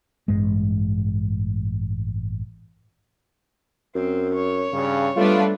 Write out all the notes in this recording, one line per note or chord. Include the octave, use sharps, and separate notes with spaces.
A1 G2 G#3
F#2 C4
C#5
G2 C#3
G3 A3 B3 D4 F4 B4